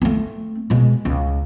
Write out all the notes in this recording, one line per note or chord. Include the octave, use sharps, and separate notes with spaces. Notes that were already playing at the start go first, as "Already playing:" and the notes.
A3 C4
B2 G#3
C#2